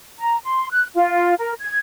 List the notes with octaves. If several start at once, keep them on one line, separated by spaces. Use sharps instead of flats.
A#5
C6
F#6
F4
A#4
G#6